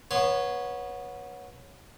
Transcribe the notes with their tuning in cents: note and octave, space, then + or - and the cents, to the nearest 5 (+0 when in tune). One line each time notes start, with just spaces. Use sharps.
B3 -20 C#5 +0 C6 -25